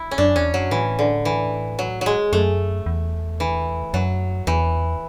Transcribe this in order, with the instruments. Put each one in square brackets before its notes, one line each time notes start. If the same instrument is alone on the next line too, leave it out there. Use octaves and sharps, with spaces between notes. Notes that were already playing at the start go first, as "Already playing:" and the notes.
Already playing: [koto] E4
C#4
[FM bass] F#2 [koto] D4
[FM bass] E2 [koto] C#4
[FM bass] F#2 [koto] F#3
[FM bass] A2 [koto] E3
[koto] D3
E3
F#3
F#3 G#3
[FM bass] F#2 [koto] A3
[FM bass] E2
[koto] E3
[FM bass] F#2 [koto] F#3
[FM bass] E2 [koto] E3